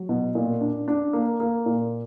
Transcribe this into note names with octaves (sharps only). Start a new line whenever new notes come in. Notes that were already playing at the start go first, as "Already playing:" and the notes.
Already playing: F#3
B2
A#2
D4
D4
A#3
A#3
A#2